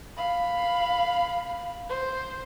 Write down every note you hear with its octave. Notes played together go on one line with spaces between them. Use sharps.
F5 B5
C5